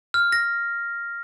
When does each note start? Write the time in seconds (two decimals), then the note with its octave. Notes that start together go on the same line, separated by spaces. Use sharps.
0.14 F6
0.32 A#6